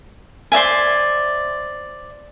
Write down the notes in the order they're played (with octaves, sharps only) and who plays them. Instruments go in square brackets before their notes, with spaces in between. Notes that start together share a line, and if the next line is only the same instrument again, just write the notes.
[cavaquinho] C5 D5 E5 G#5